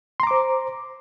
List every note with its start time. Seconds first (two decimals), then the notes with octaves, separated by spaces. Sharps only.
0.20 C6
0.23 A#5
0.27 D6
0.31 C5